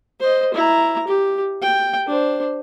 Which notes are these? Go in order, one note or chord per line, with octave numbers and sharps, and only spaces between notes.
C5 D#5
E4 A#5
G4
G5
D4 C5